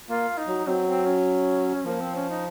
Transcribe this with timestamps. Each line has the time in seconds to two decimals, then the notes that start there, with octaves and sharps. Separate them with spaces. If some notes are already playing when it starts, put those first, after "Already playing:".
0.08 A#3 F4
0.38 D#4
0.47 F#3
0.67 F#3 C4
0.87 C4
1.06 C#4
1.85 F3 A#3
2.00 C4
2.15 C#4
2.29 D#4